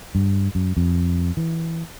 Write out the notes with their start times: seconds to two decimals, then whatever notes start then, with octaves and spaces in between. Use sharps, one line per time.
0.15 G2
0.55 F#2
0.77 F2
1.37 E3